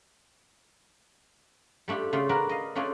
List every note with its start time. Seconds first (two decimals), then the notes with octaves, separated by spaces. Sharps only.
1.88 G3 A3 D4 F4 G4
2.13 C#3 A3 F4
2.29 D4 F#4 A#4 B4
2.49 D#5 F5
2.75 A3 C#4 D4 F4 G#4 A4